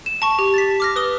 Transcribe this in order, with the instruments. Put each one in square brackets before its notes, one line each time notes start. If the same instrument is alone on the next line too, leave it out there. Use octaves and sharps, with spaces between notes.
[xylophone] E7
A5 C#6
G4
A6 B6
D6 F6 A#6
B4 D#6 G7